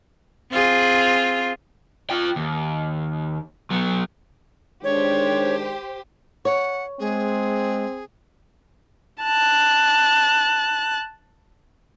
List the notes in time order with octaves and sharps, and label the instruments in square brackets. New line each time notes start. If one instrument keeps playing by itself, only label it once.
[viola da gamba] C4 F4 G#4
[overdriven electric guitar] F4 G5
D#2
F#3 B3
[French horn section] D#3 G#3 D4 [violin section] G4 C5 [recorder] C#5
[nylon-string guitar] C#5 [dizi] F#5
[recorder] G#3 [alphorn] C4 [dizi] G#4
[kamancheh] A5 F#6